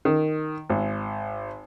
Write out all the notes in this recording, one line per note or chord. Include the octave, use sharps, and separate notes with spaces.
D#3
G#1